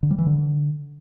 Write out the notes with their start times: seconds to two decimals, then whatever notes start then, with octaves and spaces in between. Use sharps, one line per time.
0.03 D3
0.11 G3
0.19 E3
0.26 D3